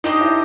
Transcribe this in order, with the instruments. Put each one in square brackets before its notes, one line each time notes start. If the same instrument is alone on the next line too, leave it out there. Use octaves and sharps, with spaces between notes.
[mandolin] D4 G4 C5 D#5 [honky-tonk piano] D#4
[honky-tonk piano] E4